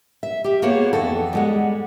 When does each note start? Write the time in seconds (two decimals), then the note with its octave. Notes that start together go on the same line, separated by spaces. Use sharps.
0.23 E5
0.44 G4 E5
0.62 A#3 B3 F#4 G#4 C5 C#5
0.93 F2 E3 B3 F#4 A4
1.33 G3 G#3 F#5